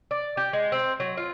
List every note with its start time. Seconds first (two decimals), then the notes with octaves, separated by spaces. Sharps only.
0.11 D5
0.37 G4
0.53 G#3
0.72 C4
1.00 F#3
1.17 F4